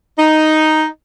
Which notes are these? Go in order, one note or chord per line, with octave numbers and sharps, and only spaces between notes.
D#4